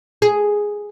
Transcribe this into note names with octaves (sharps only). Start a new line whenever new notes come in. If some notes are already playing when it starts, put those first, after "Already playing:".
G#4